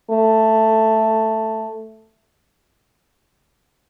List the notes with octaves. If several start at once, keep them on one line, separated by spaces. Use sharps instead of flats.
A3